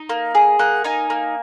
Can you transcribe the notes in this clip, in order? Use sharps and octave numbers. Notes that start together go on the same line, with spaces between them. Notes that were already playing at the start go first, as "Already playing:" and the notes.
Already playing: D#4
A#3
G#4
A#3 F#5
D#4 G#5
A#3